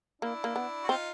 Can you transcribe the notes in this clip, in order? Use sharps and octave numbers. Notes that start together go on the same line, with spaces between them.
A#3 D4 E4
A#3
B3
F#4
C4 D#4 F4